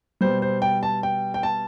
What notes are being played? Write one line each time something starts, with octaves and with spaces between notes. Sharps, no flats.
B2 G3 C5
C5
G5
A5
G5
G5
A5